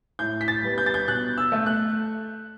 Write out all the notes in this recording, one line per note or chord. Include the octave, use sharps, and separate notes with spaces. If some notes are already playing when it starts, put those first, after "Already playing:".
A2 G6
B6
A6
G3 B3
G6
A6
G6
B2 F#6
E6
A3
F#6